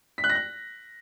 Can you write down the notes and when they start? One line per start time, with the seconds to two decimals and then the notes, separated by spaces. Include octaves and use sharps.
0.18 B6
0.24 F#6
0.29 A#6
0.35 F#6